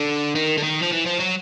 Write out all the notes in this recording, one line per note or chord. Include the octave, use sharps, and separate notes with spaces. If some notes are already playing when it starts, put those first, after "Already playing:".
Already playing: D3
D#3
D3
D#3
F3
E3
F3
F#3